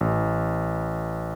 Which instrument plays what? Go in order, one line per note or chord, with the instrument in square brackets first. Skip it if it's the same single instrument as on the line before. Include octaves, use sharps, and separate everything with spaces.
[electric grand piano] A1